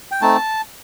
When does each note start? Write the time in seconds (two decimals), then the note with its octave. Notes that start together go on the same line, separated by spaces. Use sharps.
0.12 G5
0.21 A3 C4 D#4 A5